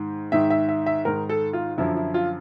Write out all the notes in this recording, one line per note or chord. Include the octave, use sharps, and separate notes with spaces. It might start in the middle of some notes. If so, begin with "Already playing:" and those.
Already playing: G#2 D#3
G#2 D#3 E5
E5
E5
E5
G#2 D#3 A#4
A4
F4
F#2 D3 F3 E4
E4
F4